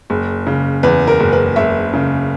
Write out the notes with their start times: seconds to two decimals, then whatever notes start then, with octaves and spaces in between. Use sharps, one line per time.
0.10 F#1
0.47 C#3
0.83 E2 B4
1.07 A#4
1.20 F#1
1.33 B4
1.56 F#1 E5
1.93 C#3